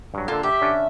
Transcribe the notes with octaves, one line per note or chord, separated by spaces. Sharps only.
G2 F#3
D3 A#3 F4 A4
G4 E5
D3 C#4 D4